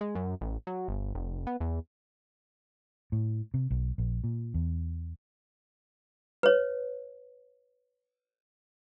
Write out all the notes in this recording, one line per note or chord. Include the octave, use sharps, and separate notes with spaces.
G#3
F#2
A1
F#3
G1
F1
B3
E2
A2
C3
B1
A#1
A#2
E2
B4 C#5